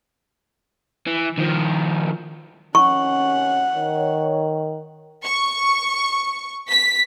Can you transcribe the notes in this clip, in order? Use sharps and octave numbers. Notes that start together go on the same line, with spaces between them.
E3
D#3 F3
C3 D#3 C#4 F#5 C#6
D#3 C#5
C#6
B6